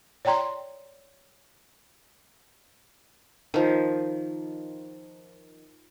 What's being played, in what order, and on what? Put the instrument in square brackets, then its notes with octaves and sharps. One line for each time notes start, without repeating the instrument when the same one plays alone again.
[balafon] C#5 D5 G5 A#5 C6
[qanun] D#3 F3